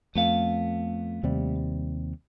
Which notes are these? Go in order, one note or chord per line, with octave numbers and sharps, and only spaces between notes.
F2 A3 B3 F5
D#2 C3 G3